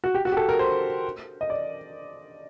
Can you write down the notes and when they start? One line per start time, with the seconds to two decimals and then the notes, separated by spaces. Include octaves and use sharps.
0.04 F#4
0.14 G4
0.25 F#4
0.32 G4
0.37 A4
0.49 A#4
0.59 C5
1.41 D#5
1.50 D5